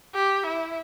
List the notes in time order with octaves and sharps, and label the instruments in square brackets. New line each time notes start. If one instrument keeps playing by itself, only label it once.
[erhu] G4
E4